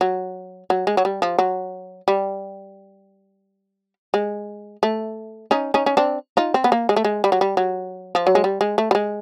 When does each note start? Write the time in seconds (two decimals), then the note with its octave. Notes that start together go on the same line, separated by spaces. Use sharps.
0.01 F#3
0.70 F#3
0.87 G#3
0.97 F#3
1.05 G3
1.22 F3
1.38 F#3
2.08 G3
4.14 G#3
4.83 A3
5.51 C#4 D#4
5.74 C#4 D#4
5.86 C#4
5.97 C4 D4
6.37 D#4 F4
6.54 C4
6.64 B3
6.72 A#3
6.89 G#3
6.96 A3
7.04 G#3
7.24 G3
7.32 F#3
7.41 G3
7.57 F#3
8.15 F3
8.27 F#3
8.35 G#3
8.44 G3
8.61 G#3
8.78 A3
8.91 G3
8.95 G#3